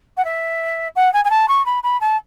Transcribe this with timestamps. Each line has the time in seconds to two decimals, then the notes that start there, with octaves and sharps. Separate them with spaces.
0.17 F#5
0.25 E5
0.96 F#5
1.14 G#5
1.25 G#5
1.30 A5
1.48 C#6
1.66 B5
1.83 B5
2.01 A5